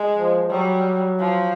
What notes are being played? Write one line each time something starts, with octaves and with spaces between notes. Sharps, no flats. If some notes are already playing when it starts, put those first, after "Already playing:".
Already playing: G#3
F3
F3
F#3 G3
F3